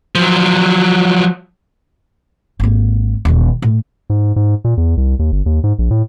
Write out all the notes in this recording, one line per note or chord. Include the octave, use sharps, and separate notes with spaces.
F3 F#3
G#1 A#3
D#1 D3
A2
G#2
G#2
A#2
E2
C2
D#2
G1
D#2
G#2
A#1
A2